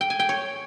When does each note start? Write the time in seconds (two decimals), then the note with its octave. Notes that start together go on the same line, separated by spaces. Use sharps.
0.01 G5
0.10 G#5
0.20 G5
0.29 C#5